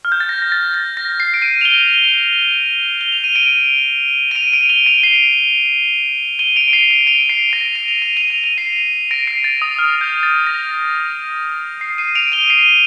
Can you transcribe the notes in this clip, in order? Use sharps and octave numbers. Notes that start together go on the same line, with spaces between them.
F6
G6
A6
A#6
A#6
A6
A6
A#6
C7
D7
C7 D#7
F7
D#7 G7
G7
F7
D#7
D7 F7
D#7
D7 F7
D7 F7
D#7 G7
D7 F7
C7 D#7
D#7 G7
D7 F7
D7
C7 D#7
C7 D#7
D7 F7
C7 D#7
A#6 D7
D#7
F7
D#7
F7
D#7
F7
C7 D#7
A#6 D7
C7 D#7
A6
D#6
F6
G6
A6
A#6
C7
C7 D#7
D7 F7
D#7 G7
C7 D#7